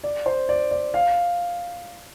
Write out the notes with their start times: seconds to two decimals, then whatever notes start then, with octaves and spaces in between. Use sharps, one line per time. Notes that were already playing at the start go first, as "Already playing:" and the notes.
0.04 D5
0.26 C5
0.49 D5
0.71 D5
0.94 F5